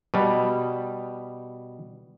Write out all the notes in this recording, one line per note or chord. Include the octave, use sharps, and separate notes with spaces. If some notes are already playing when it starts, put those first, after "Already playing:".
B2 G3